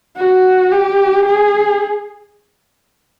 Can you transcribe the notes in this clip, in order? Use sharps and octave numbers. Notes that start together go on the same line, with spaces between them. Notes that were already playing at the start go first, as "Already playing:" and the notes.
F#4
G4
G#4